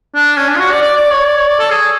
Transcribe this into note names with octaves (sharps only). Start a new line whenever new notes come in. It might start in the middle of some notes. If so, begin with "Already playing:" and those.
D4
C#4
D4
F4
F#4
D5
D5
D5
C#5
D5
C#5
D5
A4
G#4